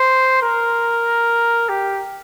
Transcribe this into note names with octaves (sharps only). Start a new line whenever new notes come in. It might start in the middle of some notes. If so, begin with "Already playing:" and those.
Already playing: C5
A#4
G4